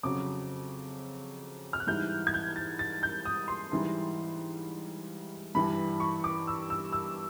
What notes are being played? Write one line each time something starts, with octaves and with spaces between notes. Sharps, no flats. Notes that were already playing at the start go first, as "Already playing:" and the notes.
F2 C#3 F#3 D6
F6
F#6
G#2 E3 G3 G6
G#6
G6
A6
A6
G6
D#6
C6
G#2 E3 G3
G2 E3 G3 B5
C#6
D6
E6
E6
E6